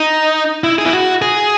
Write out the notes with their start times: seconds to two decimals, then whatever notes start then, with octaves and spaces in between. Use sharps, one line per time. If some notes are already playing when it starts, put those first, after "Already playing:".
Already playing: D#4
0.64 E4
0.78 G#4
0.86 E4
0.93 F#4
1.22 G#4